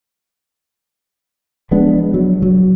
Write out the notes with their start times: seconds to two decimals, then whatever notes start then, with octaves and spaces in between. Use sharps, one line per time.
1.71 F3 G#3 B3 D4
2.14 F#3
2.42 F#3